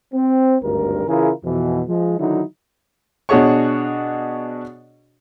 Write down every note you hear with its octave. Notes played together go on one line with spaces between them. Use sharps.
C4
G#1 D2 G2 A#4
C#3 E3 E4 F4 G#4 A#4
F2 B2 E3
F3 G#3
D3 D#3 F#3 D#4 E4
B2 D4 F#4 G#4 C#5 C#6